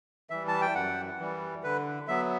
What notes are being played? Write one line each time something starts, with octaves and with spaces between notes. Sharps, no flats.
E3 G3 E5
A5
G5
F#2 F#5
E3 G3
D3 B4
F#3 B3 E5